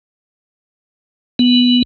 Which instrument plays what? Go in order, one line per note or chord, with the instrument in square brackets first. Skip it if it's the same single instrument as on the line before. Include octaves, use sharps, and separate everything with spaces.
[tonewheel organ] B3